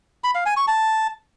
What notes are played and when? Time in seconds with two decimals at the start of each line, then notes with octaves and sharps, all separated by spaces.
0.24 B5
0.35 F5
0.46 G#5
0.57 C#6
0.68 A5